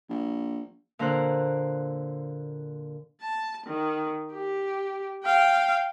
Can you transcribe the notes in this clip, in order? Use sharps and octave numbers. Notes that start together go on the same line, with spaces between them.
A#1
A#2 D3 A#4 C5 F#6
A5
D#3
G4
F5 G5